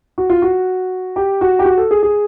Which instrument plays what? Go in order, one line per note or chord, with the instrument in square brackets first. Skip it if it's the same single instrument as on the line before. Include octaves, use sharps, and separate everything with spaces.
[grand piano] F#4
F4
F#4
G4
F#4
G4
F#4
A4
G#4
G#4